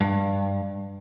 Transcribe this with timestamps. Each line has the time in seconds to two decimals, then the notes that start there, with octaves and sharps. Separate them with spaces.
0.01 G2